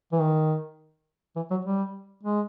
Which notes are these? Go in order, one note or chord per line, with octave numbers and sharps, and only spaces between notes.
E3
D#3
E3
F#3
G3
G#3